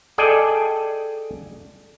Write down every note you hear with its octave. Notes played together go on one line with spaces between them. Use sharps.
G#4 A4 D5 D#5 G5 G#5